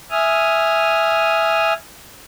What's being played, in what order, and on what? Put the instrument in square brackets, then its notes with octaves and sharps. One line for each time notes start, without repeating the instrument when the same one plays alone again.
[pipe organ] E5 G#5 D#6 F6